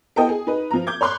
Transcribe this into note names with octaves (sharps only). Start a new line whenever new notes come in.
B3 E4 A4 D#5 G5
G#4
D#4 B4
F3 A#5
D6 G6 G#6
C#5 B5 C6 D6 F#6